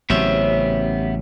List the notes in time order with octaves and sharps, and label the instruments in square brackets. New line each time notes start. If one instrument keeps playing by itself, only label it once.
[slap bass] A1 C#3 [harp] F#3 C4 C#5 [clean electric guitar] B3 G4 E5